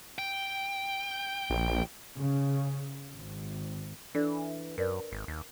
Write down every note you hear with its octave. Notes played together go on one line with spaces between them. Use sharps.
G5
A#1
C#3
G#1
E3 D4 A4 D5
F#2 A#4 B4 D5
G#1
D#2